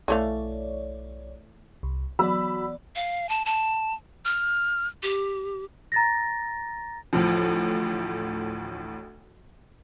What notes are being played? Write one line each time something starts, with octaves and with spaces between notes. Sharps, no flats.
B1 E3 A3 C#5 D5 F5
C2
E3 F#3 B3 D5 B5 E6
F5
A5
A5
F6
G4
A#5 A6 A#6
A1 D2 A2 F3